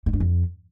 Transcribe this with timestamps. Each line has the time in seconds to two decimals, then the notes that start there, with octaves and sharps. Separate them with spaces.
0.06 G#2
0.13 G2
0.20 F2